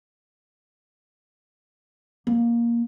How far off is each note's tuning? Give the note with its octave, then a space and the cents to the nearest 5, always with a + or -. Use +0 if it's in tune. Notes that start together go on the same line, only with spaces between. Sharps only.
A#3 +10